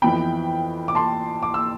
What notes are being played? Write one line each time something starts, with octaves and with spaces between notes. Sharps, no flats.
F2 E3 B3 G5 B5
D6
A5 C6
D6
E6